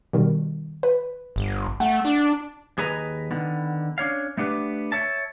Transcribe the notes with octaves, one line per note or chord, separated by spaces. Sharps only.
B2 D#3 G3
B4
G1
A3 F#5
D4
D#2 G#4 B4 D#5 A#5
D3 D#3 B3
C#4 D4 C#5 F5
A3 B3 D4 G4 B4
C#5 E5 A5